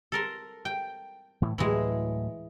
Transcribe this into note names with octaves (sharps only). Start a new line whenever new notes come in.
A4 A#4 C6
G5
A2 E3 A3
D2 A2 E3 F#3 G#3